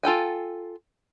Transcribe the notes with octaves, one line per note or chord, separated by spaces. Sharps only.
F4 A4 G5 G#5